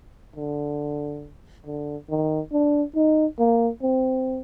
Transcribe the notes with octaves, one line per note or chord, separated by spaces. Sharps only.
D3
D3
D#3
D4
D#4
A#3
C4